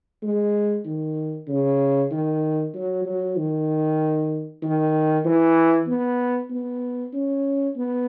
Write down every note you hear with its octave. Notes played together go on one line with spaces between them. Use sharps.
G#3
D#3
C#3
D#3
F#3
F#3
D#3
D#3
E3
B3
B3
C#4
B3